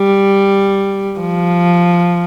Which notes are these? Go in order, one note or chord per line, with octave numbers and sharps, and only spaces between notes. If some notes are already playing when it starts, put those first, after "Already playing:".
Already playing: G3
F3